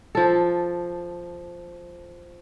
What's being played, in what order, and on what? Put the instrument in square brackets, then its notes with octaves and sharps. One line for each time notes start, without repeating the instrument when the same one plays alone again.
[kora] F3 A4